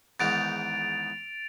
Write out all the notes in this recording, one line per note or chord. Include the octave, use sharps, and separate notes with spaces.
E2 G#2 D#3 A6 D7 F7